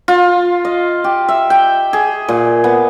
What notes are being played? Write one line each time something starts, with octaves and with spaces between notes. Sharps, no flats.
F4
D#5
G4
E5
G5
G#4
A#2
B3